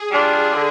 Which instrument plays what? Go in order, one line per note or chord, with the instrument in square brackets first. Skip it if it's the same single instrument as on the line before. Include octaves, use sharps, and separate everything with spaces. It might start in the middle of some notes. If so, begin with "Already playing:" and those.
Already playing: [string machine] G#4
[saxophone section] G3 D4 F4
D3